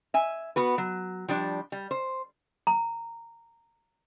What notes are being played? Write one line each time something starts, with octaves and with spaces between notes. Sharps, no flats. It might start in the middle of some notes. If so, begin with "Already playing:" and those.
E5 G#5
B3 F#4 B4
F#3
F3 G3 D4
G3
C5
A#5